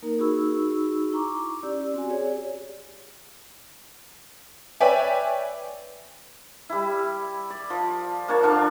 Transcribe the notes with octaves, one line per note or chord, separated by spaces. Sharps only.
A#3 D#4 A#4
D#4 F#4 G#4 B5 C#6 E6
E4 A#5 C#6 D6
C#4 G4 D5 E6
C4 F#4 G#5
G4 G#4 C#5 D5
B4 C#5 D5 E5 G5 G#5
G3 E4
D5
F3
A#3 D4 C#5 A5
D3 D4 F5 C#6